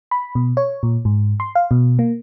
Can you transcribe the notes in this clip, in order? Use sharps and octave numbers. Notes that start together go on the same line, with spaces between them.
B5
B2
C#5
A#2
G#2
C6
F5
B2
A#3